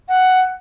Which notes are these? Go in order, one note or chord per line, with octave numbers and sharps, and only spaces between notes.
F#5